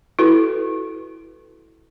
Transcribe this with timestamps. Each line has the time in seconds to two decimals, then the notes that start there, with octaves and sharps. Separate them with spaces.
0.19 E4 F#4 A4 B4 C6